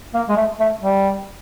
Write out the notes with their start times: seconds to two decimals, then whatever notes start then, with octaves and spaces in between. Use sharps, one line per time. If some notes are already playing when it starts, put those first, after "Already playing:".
0.14 A#3
0.29 G#3
0.37 A3
0.60 A3
0.82 G3